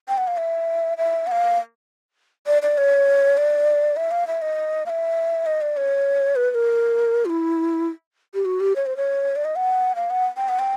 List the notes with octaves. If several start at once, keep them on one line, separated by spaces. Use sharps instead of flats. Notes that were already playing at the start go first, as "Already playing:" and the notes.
G5
F#5
F5
E5
E5
F#5
F5
D5
D5
C#5
D5
E5
F5
E5
D#5
F5
E5
D#5
D5
C#5
B4
B4
A#4
F4
E4
G4
F#4
G4
C#5
C5
C#5
D5
D#5
F#5
F5
F#5
G5
F#5
G5